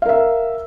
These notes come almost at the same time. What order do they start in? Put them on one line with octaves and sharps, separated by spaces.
F5 A#4 E5